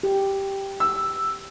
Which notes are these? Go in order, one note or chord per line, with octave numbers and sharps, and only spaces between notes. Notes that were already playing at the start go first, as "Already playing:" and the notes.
G4
E6